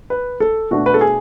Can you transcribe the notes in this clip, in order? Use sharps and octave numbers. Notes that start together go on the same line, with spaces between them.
B4
A4
B2 A3 D4 F#4
B4
A4
G#4